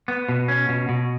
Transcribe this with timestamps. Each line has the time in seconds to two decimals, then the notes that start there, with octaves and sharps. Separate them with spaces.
0.08 B3
0.29 B2
0.48 C#4
0.69 B2
0.89 B2